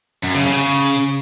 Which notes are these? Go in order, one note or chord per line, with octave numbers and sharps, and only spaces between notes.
F#2
C#3
C#3